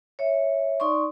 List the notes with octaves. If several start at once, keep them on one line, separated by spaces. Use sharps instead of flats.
C#5 E5
D#4 D5 C6 C#6